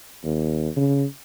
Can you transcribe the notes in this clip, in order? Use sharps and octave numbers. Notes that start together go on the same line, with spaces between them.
D#2
C#3